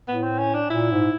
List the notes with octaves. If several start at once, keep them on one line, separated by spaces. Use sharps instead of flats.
A2 B3
C4
C#4
D4
A#2 E4
G#2